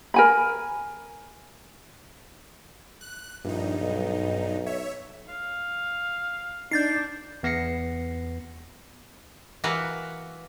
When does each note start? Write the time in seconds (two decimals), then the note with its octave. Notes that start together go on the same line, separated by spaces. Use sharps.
0.14 A#4 G#5 B5
3.01 F#6
3.44 A#1 G2 D#4
3.80 B1
4.66 C#5 E5
5.29 F5
6.71 D4 D#4 G6 A6 C7
7.43 E2 B3 A#6 C7 C#7
9.64 E3 A#3 F#4 B4